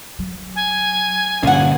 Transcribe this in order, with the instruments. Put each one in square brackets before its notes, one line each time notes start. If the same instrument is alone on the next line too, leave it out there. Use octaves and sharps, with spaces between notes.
[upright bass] F#3
[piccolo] G#5
[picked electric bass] G2 A#2 C#4 [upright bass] D3 [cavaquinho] F4 F#5